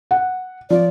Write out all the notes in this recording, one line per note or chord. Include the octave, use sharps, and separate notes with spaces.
F#5
F3 D5